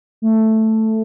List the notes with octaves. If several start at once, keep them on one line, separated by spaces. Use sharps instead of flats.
A3